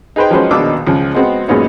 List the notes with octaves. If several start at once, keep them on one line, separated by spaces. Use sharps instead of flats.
D#4 G#4 B4 C5 G5
F3 F#3 G#3 C#4 B4 C5
A#1 B2 D#3 D4 D6 E6
C#2 F3
G#3 B3 C4 F#4
F#2 A#2 G#3 B3 C#4 D#4